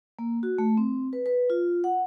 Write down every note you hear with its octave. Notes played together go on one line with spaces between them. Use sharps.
A#3
F#4
A3
C4
B4
B4
F4
F#5